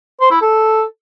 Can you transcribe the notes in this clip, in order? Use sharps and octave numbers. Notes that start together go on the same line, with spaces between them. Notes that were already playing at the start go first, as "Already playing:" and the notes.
C5
E4
A4